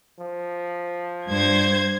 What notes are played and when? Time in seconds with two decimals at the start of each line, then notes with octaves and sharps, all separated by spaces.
0.20 F3
1.28 G2 C5 G#6